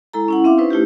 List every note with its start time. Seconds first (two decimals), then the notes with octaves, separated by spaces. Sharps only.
0.13 G#3 E4 A4 A#5
0.28 C#4 E4 F#5
0.44 C4 E5 F5 D6
0.58 C#4 D#4 E4 B4 C5
0.70 A3 E4 F4 G4